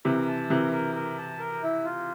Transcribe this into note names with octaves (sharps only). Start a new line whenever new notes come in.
C3 E3 A#4
A5
C3 E3 A#4
A#4
A#4
A5
A#4
E4
F4